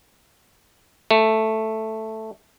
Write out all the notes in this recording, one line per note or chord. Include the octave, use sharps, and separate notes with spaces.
A3